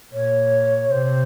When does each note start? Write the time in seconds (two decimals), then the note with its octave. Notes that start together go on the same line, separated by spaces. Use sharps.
0.13 A#2 C#5
0.91 C3 C5